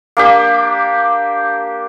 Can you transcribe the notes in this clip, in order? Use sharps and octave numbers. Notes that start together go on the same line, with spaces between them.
A#3 D4 G4